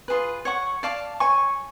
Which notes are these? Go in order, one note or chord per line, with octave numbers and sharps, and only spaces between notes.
F4 G#4 B4
C#5 F#5 C#6
D5 F5 A5 D6
C#5 G#5 C#6